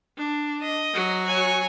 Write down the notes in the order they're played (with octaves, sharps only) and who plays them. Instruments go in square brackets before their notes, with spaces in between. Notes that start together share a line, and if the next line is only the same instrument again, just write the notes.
[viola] D4
[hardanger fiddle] D#5
[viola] F#3 F#4
[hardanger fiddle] C#5 G#5